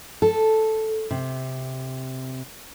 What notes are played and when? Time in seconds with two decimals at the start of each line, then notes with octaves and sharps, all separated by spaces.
0.22 A4
1.11 C3